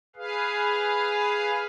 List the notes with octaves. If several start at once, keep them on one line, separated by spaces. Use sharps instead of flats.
G#4 B4 F5